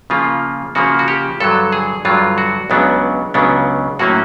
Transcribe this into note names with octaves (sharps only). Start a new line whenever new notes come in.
C#3 F3 A#3 F4
C#3 F3 A#3 F#4
F#4
G4
G2 D3 F#3 A4
G#4
G2 D3 F#3 F4
F#4
C#2 C#3 F#3 B3 D4
C#2 C#3 F#3 B3 D4
A2 F#3 A#3 C#4 F#4